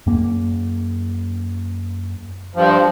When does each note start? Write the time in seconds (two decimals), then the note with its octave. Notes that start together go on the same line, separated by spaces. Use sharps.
0.07 F#2 A#3
2.55 G2 F3